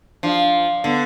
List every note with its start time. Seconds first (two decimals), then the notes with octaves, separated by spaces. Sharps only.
0.23 F3 D4
0.84 D3 B3